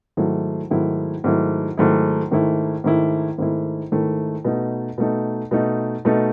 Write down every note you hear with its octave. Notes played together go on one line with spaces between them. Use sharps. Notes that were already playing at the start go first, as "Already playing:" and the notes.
G#2 D#3 F#3 A3 E4
G#2 D#3 F#3 A3 E4
G#2 D#3 F#3 A3 E4
G#2 D#3 F#3 A3 E4
G#2 D#3 A3 E4
G#2 D#3 A3 E4
G#2 D#3 A3 E4
G#2 D#3 A3 E4
B2 A3 D#4
B2 A3 D#4
B2 A3 D#4
B2 A3 D#4